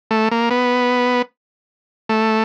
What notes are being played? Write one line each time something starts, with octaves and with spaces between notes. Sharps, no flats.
A3
A#3
B3
A3